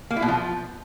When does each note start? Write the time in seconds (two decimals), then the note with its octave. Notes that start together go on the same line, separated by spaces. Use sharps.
0.11 A#3
0.16 E4
0.22 B2
0.28 F3